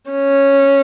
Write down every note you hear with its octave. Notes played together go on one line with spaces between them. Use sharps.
C#4